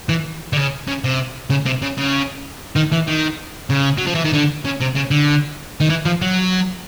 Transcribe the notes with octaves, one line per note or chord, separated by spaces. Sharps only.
E3
D3
C#3
C#3
C3
C#3
C3
C#3
C#3
D#3
E3
D#3
C#3
F#3
F3
E3
D#3
D3
C#3
C3
C#3
D3
D#3
E3
F3
F#3